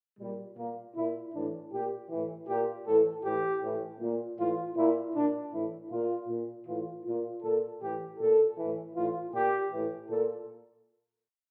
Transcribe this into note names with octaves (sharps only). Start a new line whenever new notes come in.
A#2 G3
A#2 A#3
A#2 E4
A2 E3 D4
A#2 G4
A2 E3
A#2 G4
A2 E3 A4
A2 E3 G4
A2 E3
A#2
A2 E3 F4
A#2 E4
A#2 D4
A2 E3 E4
A#2 F4
A#2
A2 E3 F4
A#2 F4
A#2 A4
A2 E3 G4
A#2 A4
E3
A2
A2 E3 F4
A#2 G4
A2 E3
A#2 A4